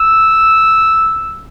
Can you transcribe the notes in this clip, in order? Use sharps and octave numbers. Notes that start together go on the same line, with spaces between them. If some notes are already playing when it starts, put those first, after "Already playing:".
Already playing: E6